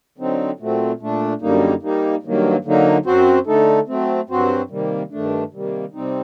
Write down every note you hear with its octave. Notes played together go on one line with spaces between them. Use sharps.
D3 F#3 C4 D#4
A#2 F#3 A3 C4
A#2 A3 D4
F#2 D3 G3 A#3 D#4
G3 A#3 D#4
G2 D#3 F#3 A#3
D3 F#3 A#3 D#4
F#2 F#3 C4 F#4 C5
D3 A3 D#4 A4
F#3 A3 C4
G2 F#3 C4 F#4 C5
C3 D#3 G3 A#3
G2 D#3 A3 D4
C3 D#3 G3 A#3
C3 G3 C4 D#4